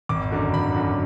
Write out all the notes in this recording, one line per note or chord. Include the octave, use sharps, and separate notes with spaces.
G#1 D6
F#2 D3 F#3
G#1 B5
F#2 D3 F#3